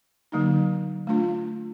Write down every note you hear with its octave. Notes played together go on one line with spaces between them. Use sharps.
D3 F#3 A#3 D#4
A3 D4 F4